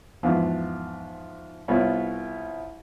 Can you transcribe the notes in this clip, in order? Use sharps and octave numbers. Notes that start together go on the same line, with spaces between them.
E2 G#2 F3 B3 F5
C2 B3 F4 C#5 B5